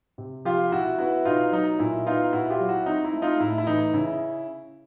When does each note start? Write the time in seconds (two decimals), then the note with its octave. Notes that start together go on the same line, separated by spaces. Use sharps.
0.18 C3
0.45 F3 F4 G4
0.72 B2 E4 F#4
0.98 B3 E4 F#4
1.25 B2 D#4 F4
1.52 F#3 D#4
1.79 A#2 E4
2.06 B3 D#4 F4
2.32 A#2 E4 F#4
2.50 F4 G4
2.60 F#3
2.69 E4 F#4
2.86 C4 D#4
3.05 E4
3.13 A3
3.22 D#4 F4
3.40 A2 E4
3.58 E4
3.67 E3 D#4
3.94 C#3 E4